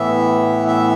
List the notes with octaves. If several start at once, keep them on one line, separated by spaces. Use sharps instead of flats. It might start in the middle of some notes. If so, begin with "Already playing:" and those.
Already playing: A2 E3 B3 E5
E5